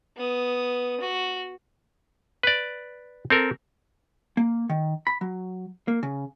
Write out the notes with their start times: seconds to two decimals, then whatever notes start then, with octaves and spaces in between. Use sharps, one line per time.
0.17 B3 D#6
1.00 F#4
2.43 B4 D5
3.30 C4 A4 A#4
4.37 A#3
4.70 D#3
5.07 B5
5.21 F#3
5.88 A#3
6.03 C#3